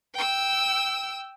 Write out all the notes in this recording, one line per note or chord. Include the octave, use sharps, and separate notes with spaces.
G5 E6